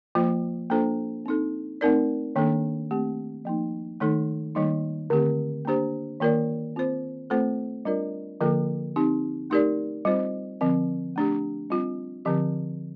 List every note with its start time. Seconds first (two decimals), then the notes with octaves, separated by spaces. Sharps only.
0.15 F3 A#3 F4 C5
0.70 A#3 D4 F4 A4 C5
1.26 C4 D#4 A4
1.81 A3 C4 D#4 A#4 D5
2.36 D#3 A#3 D4 A4
2.91 A3 C4 G4
3.45 F3 A#3 D#4
4.00 D#3 A3 D#4 A4
4.55 D#3 G3 A#3 D#4
5.10 D3 A3 C4 G4
5.65 A#3 D4 G4 C5
6.20 D#3 A#3 F4 A#4 D5
6.76 C4 F4 C5
7.30 A3 C4 F4 A4 C5
7.85 G3 D4 F4 A#4 D5
8.41 D3 F3 A#3 F4 A4
8.96 C4 D#4 G4
9.50 A3 D#4 G4 A#4 D5
10.05 G3 C4 F4 C5
10.61 D3 F3 C4
11.16 A3 D4 G4
11.70 G3 C4 F4
12.25 D3 F3 C4 G4